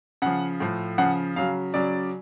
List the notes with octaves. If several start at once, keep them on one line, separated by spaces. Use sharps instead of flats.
C#3 F3 F#5
A2 F3
C#3 F3 F#5
C#3 F#3 F5
C#3 F#3 D5